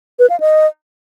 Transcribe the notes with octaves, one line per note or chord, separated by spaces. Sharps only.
B4
F5
D#5